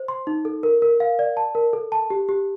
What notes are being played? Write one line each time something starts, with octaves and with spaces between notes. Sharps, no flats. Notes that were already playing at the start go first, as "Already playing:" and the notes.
Already playing: C5
C6
D#4
A4
A#4
A#4
F5
D5
A5
A#4
A4
A5
G4
G4